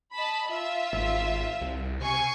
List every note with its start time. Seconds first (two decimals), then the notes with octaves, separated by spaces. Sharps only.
0.14 D#5 A5 B5
0.48 F4 E5
0.93 G#1
1.61 C2
2.01 C3 G#5 C#6 C7